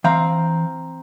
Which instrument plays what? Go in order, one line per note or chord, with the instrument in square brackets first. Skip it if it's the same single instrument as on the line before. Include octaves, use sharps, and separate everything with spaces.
[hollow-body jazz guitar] E3 F5 [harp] C4 A#5